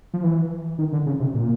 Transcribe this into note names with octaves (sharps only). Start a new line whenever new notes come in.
F3
E3
D#3
D3
C#3
C3
A#2